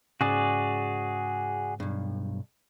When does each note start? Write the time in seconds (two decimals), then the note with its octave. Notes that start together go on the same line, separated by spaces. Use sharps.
0.21 G#2 C#3 F#4 G#4 D5
1.80 B1 G2